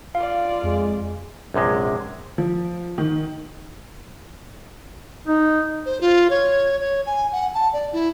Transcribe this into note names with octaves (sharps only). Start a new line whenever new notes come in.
F4 D5 F5
F2 G#3
A#1 F#2 C3 G#3
F3
D#3
D#4
C5
F4
C#5
C#5
G#5
F#5
A5
D5
E4